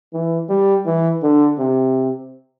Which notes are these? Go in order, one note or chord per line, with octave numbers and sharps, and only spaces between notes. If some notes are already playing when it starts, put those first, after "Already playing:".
E3
G3
E3
D3
C3